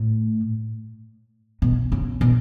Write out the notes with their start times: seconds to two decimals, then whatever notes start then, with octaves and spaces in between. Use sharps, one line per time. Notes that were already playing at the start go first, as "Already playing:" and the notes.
Already playing: A2
1.62 B2
1.92 C#3
2.21 B2